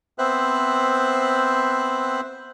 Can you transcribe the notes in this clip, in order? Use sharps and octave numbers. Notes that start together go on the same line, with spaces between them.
B3 C4 C5 E5 F#6